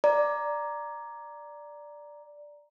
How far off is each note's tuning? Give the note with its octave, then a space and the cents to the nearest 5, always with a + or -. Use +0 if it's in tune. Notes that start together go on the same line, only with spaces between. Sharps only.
D5 +0 A#5 +0